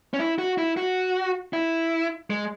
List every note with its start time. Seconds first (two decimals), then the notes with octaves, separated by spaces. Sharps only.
0.14 C#4
0.19 E4
0.39 F#4
0.58 E4
0.77 F#4
1.53 E4
2.30 G#3